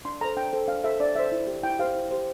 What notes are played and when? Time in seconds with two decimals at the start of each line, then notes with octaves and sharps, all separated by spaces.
0.05 D4 C6
0.21 A4 A#5
0.24 C5
0.37 D4 G5
0.53 A4 C5
0.68 D4 F5
0.84 A4 C5 E5
1.00 D4 D5
1.15 A4 C5 E5
1.32 E4
1.47 G4 C5
1.63 E4 G5
1.79 G4 C5 F5
1.95 E4
2.11 G4 C5